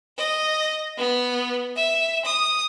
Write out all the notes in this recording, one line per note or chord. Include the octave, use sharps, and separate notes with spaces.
D#5
B3
E5
D#6